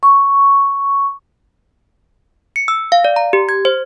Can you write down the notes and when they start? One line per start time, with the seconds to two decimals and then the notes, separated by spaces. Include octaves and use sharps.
0.03 C#6
2.56 C#7
2.68 E6
2.92 F5
3.05 D5
3.16 A#5
3.33 G4
3.49 G#6
3.65 C5